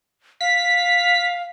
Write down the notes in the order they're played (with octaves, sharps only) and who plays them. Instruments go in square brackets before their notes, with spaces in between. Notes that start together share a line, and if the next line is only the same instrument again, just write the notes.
[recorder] F5 [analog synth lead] B6